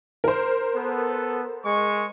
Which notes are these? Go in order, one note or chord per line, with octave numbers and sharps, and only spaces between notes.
A#4 C5
B3 A4
G#3 C#6